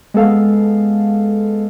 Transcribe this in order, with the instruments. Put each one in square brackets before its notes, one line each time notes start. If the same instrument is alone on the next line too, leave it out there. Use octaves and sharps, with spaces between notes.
[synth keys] G#3 B3 A4 F5